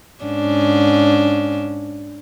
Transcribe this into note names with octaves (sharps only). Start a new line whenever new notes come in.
G#2 C#4 D4